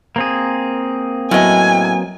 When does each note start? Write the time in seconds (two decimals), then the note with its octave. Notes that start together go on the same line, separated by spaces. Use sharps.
0.16 A#3 C4 G#4
1.31 A2 F#3 B3 D#5 G#5